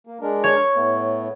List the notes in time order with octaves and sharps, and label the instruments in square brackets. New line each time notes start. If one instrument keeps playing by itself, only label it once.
[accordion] A#3
G#3 D4 A#4
[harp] C#5
[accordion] A2 A3 B3